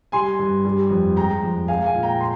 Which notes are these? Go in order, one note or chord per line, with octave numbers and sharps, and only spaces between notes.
G3 G#5 C6
G2
G3
F2
G#3 G5 A#5
F2
G#3 F5 G#5
F5 G#5
A#2
G5 A#5
C6